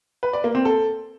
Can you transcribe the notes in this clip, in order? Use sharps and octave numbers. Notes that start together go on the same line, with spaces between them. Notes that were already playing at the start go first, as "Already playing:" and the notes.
B4
D5
A#3
C4
A4